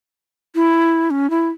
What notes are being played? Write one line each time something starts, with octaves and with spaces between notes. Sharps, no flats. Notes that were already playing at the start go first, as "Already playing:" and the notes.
E4
C#4
E4